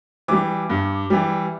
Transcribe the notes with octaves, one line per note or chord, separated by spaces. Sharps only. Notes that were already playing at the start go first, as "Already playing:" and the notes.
E3 G3 D6
G2
E3 G3